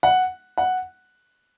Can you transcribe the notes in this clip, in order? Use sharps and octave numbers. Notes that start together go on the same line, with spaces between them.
F#5
F#5